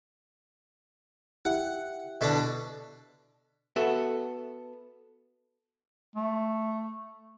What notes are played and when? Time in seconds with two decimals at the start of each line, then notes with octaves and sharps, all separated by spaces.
1.45 E4 G4 E5 F#5
2.21 B2 D3 D4
3.76 B3 F#4 A4 E5
6.16 A3